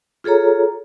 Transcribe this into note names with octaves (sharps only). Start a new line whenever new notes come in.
F4 G#4 A4 C#5 A#5